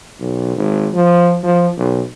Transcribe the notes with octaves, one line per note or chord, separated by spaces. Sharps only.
B1
G#1
F3
F3
B1